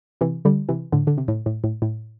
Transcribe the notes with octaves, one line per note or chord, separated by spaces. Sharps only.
C3 E3
D3 G3
C3 E3
A2 D3
D3
C3
A2
A2
A2
A2